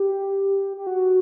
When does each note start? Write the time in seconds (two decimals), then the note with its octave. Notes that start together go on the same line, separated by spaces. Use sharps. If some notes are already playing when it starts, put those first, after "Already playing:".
Already playing: G4
0.77 G4
0.87 F#4